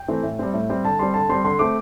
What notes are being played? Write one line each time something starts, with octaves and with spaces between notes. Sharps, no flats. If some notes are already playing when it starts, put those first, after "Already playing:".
Already playing: G5
E3 A3 C4
A2
G3 C4
A2
G3 C4
D3 A5
G3 C4 C6
D3 A5
G3 C4 C6
D3 C6
A3 C4 D6